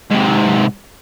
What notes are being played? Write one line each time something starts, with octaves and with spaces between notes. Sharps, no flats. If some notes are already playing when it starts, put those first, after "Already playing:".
G#2 C3